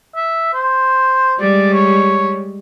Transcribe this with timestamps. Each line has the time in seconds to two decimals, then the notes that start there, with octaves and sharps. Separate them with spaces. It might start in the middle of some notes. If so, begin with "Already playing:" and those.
0.15 E5
0.53 C5
1.40 G3 G#3 D5
1.73 C#5